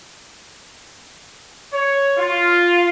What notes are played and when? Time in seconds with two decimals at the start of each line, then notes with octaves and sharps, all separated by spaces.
1.73 C#5
2.18 F4